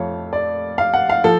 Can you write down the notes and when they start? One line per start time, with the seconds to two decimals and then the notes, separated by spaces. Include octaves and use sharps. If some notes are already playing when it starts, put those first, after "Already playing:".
Already playing: F2 F3 A3 C#5 F5
0.33 D5
0.78 F5
0.94 F#5
1.10 F5
1.24 F3 A4